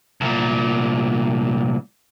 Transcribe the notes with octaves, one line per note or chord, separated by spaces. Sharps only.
C2 A#2